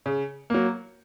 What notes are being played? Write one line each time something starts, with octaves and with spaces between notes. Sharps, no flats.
C#3
F#3 A#3